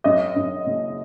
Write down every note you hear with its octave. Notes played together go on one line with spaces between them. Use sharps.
F#2 D#5
F#2
F#1